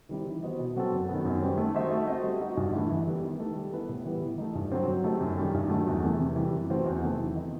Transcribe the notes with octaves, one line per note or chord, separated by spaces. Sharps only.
D#3 G3 C4 E4
E3
B3 F#4 C5 D#5
B2
F#3 C4 F#4 A4
F#2
D#3 F#3 B3
F#2
D#3 G3 C4
A3
D#4 F#4 C5 E5
A3
C4 F#4 C5 D#5
G3
D#4 F#4
G2
E3 A3 E4
E3
G3 B3
D#3
A3 D#4 A4
G3
B3 E4 B4
A2
E3 G3 B3
E3
A3 D#4
G2
F#3 C4
F#3
A3 D#4 G4
F#2
D#3 G3
G2
D#3 F#3 A3
E2
C3 E3 A3
C3
E3 G3
F#2
E3 A3 C4 F#4
E2
C3 D#3 F#3 A3
E3
B3 D#4